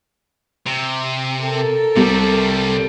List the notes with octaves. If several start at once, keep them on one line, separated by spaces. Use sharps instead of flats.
C3
A4 A#4
C2 C3 G3